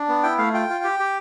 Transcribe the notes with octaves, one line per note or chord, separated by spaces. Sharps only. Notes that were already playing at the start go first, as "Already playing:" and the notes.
Already playing: D4
B3
E4 G5
A3 F5
F4 G5
F4
G4
G4